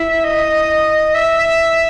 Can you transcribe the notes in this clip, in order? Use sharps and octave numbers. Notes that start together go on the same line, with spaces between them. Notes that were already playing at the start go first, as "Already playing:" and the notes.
Already playing: E4 E5
D#5
E5